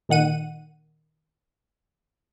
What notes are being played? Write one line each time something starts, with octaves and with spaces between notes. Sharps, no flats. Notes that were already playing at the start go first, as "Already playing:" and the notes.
A#2 D#3 F#5 D#7